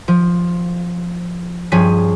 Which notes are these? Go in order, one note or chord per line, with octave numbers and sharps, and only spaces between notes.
F3
G2 F3 C#4 G#4 B6 D#7